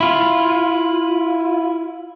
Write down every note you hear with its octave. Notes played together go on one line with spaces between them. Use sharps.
E4 F4